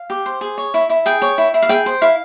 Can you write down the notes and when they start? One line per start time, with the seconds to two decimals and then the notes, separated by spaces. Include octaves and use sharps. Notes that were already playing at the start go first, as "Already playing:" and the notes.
Already playing: F5
0.10 G4
0.26 C5
0.41 G#4
0.58 C#5
0.74 E4
0.90 E4
1.06 G#4 G5
1.22 C#5
1.38 E4
1.54 E4
1.62 F5
1.69 G#4 G5
1.86 C5
2.02 E4 F5